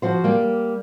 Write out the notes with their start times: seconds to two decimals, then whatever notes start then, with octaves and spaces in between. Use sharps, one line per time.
0.02 F3 F#4 C5
0.24 G3 A#3